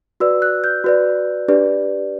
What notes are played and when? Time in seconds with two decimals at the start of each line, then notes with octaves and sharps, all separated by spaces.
0.20 F#4 B4 D5 E6
0.42 F#6
0.64 G6
0.84 F#4 B4 D5
1.48 D4 G4 B4 D5